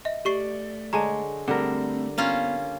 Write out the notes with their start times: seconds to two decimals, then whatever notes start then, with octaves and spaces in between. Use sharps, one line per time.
0.05 D#5 E5
0.25 A3 G4 D5 C#6 C7
0.93 D3 G#3 C#5 A5 A#5
1.48 D3 G3 A3 C4 A#4 F#5
2.18 A#3 B3 C#4 F4